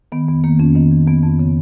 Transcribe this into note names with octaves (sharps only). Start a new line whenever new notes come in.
D#3 B3
F2 B3
D#3 A#3
F2 C#4
D#3 B3
F2
F2 B3
F2
C#3